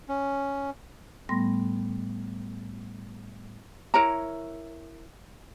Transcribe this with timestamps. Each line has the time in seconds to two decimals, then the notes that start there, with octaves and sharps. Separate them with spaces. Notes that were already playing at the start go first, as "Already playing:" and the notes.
0.08 C#4
1.29 A2 G3 A3 B3 C6 A#6
3.94 E4 A#4 C#5 A#5